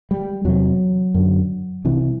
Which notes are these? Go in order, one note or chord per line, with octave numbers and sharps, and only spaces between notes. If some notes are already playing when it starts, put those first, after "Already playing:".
G3
E2 C3 F#3
F#2 D3
C2 C3 E3